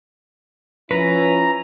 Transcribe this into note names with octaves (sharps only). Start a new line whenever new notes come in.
F3 C#4 E4 B4 A#5